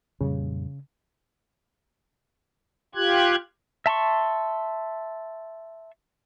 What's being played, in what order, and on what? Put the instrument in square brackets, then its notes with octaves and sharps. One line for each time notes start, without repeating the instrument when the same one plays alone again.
[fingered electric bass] F2 A#2 G3 [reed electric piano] C#3
[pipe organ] F4 G4 F#6 G#6
[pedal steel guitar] E5 A5 C6 C#6